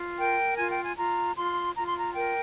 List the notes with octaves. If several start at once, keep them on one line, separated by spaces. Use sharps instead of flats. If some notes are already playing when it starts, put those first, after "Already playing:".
Already playing: F4
A#4 G5
F4 G#5
G5
G#5
F4 A#5
F4 C6
F4 A#5
C6
A#5
A#4 G5